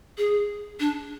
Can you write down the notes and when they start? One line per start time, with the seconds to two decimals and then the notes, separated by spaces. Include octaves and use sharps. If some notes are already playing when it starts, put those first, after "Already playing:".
0.18 G#4
0.80 D4